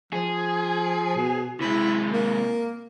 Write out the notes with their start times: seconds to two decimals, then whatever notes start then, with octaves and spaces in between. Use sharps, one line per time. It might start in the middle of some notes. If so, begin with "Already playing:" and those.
0.13 F3 G#4
1.17 B2
1.61 C3 G#3 E4
2.13 A#3